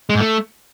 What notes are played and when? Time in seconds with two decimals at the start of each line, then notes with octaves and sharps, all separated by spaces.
0.10 G#3
0.15 G#2
0.21 A3